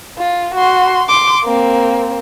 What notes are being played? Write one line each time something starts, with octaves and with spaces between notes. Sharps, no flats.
F4
F#4 C6
C6 D6
A#3 C4